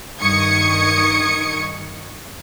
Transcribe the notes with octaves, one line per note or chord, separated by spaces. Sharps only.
G2 D#3 C#6 D#6 G#6 C#7